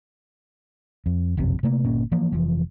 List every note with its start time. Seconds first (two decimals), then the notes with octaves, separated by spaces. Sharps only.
1.06 F2
1.37 F#1 B1 F2 C3
1.63 C3 A3 A#3
1.84 G1 A#2 A#3 C#4
2.12 E3 F3 A#3
2.32 F1 E3 F3